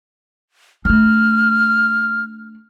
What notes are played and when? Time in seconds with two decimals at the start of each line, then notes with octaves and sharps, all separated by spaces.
0.85 A3 D4 F6